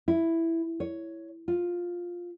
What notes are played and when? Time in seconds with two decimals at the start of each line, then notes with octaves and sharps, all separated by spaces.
0.08 E4
0.80 C#5
1.48 F4